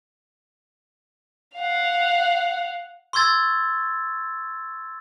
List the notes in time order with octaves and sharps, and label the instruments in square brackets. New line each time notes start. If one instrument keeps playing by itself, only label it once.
[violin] F5 F#5
[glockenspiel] C6 C#6 E6 G#6 A6